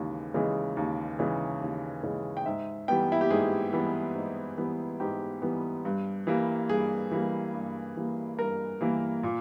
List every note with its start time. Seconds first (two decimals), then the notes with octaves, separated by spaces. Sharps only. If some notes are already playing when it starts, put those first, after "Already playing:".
Already playing: D#2 C#3 E3 G#3
0.34 C#3 E3 G#3
0.77 D#2
1.19 C#3 E3 G#3
1.61 D#2
2.03 C#3 E3 G#3
2.37 G5
2.46 G#2 E5
2.88 E3 G3 B3 G5
3.12 E4
3.21 G4
3.30 G#2 G#4
3.73 E3 G3 B3
4.15 G#2
4.58 E3 G3 B3
5.00 G#2 G4
5.42 E3 G3 B3
5.85 G2
6.27 E3 G3 A#3
6.69 G2 G#4
7.11 E3 G3 A#3
7.54 G2
7.97 E3 G3 A#3
8.39 G2 A#4
8.81 E3 G3 A#3
9.23 A#2